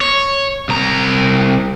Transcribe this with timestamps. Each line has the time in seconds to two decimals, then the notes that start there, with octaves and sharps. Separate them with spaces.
0.01 C#5
0.69 C2 A#5